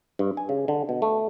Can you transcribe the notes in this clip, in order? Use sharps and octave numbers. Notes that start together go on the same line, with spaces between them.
G2
G#5
C#3
D3
B2
A3